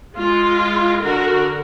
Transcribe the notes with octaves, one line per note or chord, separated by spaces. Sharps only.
G#3 F4
D3 F#4 A#4